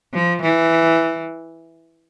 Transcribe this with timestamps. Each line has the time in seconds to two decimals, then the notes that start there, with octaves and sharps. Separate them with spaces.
0.14 F3
0.42 E3